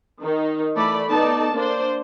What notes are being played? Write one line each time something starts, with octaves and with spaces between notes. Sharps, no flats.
D#3 D#4
E3 A3 D5 B5
B3 D#4 A4 D5 A5
A#3 D4 C5 D5